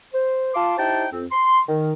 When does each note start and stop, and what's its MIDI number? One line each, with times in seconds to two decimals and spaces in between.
0.13 0.53 72
0.54 0.77 65
0.54 0.77 77
0.54 0.77 81
0.54 0.77 84
0.54 0.77 86
0.78 1.05 63
0.78 1.05 64
0.78 1.05 67
0.78 1.05 72
0.78 1.05 79
0.78 1.05 81
1.12 1.24 41
1.12 1.24 60
1.31 1.59 84
1.67 1.92 51